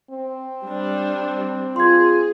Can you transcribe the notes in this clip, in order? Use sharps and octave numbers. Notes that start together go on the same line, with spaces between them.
C4
G3 D4
F4 G#4 C6 G#6